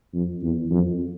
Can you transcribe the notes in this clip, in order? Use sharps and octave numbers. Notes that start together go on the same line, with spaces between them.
F2
E2
F2